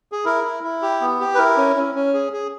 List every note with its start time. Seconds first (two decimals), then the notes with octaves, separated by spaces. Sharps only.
0.12 G#4
0.25 E4 A#4
0.44 E4
0.63 E4
0.82 G4
1.01 B3
1.20 G4
1.34 B4
1.38 E4 A#4
1.57 C#4
1.76 C#4
1.95 C#4
2.14 G#4
2.33 G#4